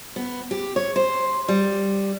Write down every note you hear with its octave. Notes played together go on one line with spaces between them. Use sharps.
B3
G4
C#5
C5
G3